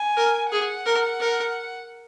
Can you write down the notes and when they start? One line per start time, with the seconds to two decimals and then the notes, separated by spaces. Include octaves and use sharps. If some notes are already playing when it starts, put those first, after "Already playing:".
Already playing: G#5
0.17 A#4
0.52 G#4 F#5
0.86 A#4
1.21 A#4